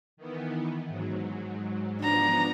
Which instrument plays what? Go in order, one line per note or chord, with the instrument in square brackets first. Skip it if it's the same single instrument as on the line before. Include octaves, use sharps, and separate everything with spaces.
[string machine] D#3 E3 B3
G#2 F#3
[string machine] F3 B3 [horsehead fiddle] D4 A#5